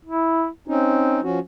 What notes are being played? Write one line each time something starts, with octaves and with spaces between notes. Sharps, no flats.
E4
C4 C#4 D#4
F3 C#4 F#4